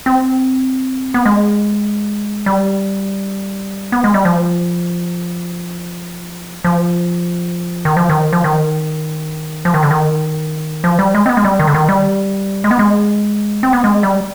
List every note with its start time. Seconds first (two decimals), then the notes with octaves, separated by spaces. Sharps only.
0.06 C4
1.14 B3
1.26 G#3
2.46 G3
3.92 B3
4.04 G#3
4.14 G3
4.25 F3
6.64 F3
7.85 D#3
7.97 F3
8.09 D#3
8.33 F3
8.44 D#3
9.65 F3
9.74 D#3
9.83 D3
9.91 D#3
10.84 F3
10.99 G3
11.15 G#3
11.26 C4
11.29 B3
11.37 G#3
11.44 G3
11.59 D#3
11.67 D3
11.74 D#3
11.89 G3
12.64 G#3
12.71 B3
12.79 G#3
13.63 C4
13.73 B3
13.84 G#3
14.03 G3